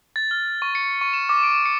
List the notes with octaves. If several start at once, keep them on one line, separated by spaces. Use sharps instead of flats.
A6
F6
C#6
C#7
C#6
E7
D6
D7
C#7